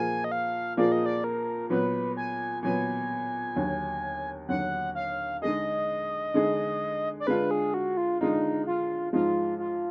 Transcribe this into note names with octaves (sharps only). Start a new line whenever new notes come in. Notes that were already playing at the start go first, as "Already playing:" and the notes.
Already playing: A#2 F3 A#3 F4 G#4 G#5
D#5
F5
A#2 F3 A#3 F4 G#4 D5
D#5
D5
A#4
A#2 F#3 B3 B4
G#5
A#2 F#3 B3 G#5
D#2 D3 F#3
D#2 D3 F#3 F#5
F5
D3 G#3 D#4 G#4 D#5
D3 G#3 D#4 G#4
D5
D3 G#3 D4 F4 B4
G#4
F#4
F4
D3 G#3 D4 D#4 F4
F4
G#2 F3 G#3 D#4 F4
F4